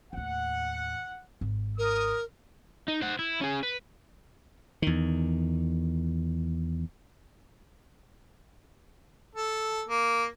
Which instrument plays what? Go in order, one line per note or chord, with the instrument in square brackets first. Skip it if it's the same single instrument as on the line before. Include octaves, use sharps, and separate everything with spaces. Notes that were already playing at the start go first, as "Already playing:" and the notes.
[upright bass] D#2 A2 [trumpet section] F#5
[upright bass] G#1
[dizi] A#4 [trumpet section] D#6
[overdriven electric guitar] D#4
C5 F#5
E4
C#4 G#4
B4
[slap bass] E2 D#3
[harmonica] A4
A#3